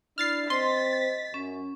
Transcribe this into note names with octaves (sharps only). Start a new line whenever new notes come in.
D4 E4 F6 A6 C7
C4 D#5 C6 A6 B6
F#2 C#4